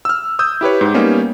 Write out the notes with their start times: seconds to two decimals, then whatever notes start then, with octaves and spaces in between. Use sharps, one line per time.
0.05 E6 F6
0.39 D#6 E6 G6
0.61 E4 G4 B4 C#5
0.81 G#2
0.94 G3 A#3 B3 C#4 D#4